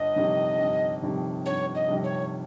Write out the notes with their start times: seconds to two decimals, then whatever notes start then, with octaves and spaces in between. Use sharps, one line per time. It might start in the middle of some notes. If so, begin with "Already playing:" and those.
Already playing: G1 D#5
0.16 F2 C3 D#3 G3
0.59 G1
1.02 F2 C3 D#3 G3
1.46 G1 C#5
1.75 D#5
1.89 F2 C3 D#3 G3
2.04 C#5